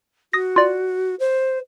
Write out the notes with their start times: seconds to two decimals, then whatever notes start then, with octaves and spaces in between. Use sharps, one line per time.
0.33 F#4 D#6 A#6
0.56 F4 D5
1.20 C5